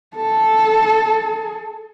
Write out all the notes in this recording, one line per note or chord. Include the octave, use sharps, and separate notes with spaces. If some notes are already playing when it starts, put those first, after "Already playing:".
A4